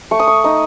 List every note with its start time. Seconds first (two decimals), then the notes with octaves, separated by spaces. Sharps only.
0.11 A3 C#6
0.20 D#6
0.27 C#6
0.44 D#4 D#6